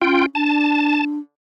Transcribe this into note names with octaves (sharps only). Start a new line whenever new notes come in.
C#4 F4 G5
D4 A5